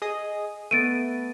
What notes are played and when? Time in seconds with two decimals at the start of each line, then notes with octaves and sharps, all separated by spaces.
0.02 G#4 D#5 D#6
0.71 A3 B3 A6 D7 D#7